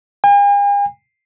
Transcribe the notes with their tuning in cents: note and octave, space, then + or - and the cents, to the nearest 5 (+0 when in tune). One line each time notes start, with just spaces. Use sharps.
G#5 -45